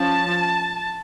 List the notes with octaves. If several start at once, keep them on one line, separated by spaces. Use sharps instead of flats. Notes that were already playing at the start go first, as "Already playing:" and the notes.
Already playing: F3 C#4 A5